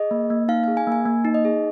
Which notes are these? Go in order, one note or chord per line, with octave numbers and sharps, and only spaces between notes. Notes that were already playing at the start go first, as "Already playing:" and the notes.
Already playing: G#4 D#5
A#3
A#3
D#4 F5
G#4 F5
G#5
A#3 G#5
A#3
D#4
D#5
G#4